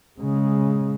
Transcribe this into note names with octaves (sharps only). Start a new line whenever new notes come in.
C#3 G#3